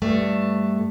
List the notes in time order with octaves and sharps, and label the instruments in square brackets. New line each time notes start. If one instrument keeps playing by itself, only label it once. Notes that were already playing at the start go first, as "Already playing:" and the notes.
[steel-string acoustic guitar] G2 A3